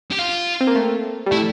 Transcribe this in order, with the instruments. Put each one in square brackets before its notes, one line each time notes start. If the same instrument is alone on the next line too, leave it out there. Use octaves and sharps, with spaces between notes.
[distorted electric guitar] G4
F4
[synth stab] C4
A#3
A3
G3
[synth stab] A3 [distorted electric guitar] E4